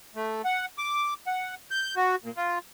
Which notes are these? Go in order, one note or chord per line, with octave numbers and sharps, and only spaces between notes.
A3
F#5
D6
F#5
G6
F#4
A#2
F4